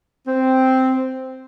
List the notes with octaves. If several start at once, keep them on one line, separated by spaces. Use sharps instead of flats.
C4